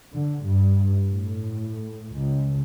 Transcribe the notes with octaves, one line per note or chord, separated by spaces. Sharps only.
D3
G2
A2
C#2